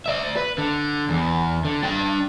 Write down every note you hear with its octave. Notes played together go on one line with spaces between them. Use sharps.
D5 E5
B4
D3
E2
D3
D4 G5